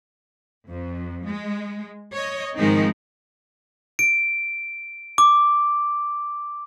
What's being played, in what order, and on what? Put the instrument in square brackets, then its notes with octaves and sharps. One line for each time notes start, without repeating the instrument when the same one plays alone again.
[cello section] F2
G#3
C#5 D#5
G#2 D#3 F3 G#3 C4 D#4
[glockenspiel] D7
D6